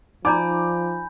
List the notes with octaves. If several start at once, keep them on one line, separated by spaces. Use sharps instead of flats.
F3 D#4 D5 G#5 A#5 B5 D6 G6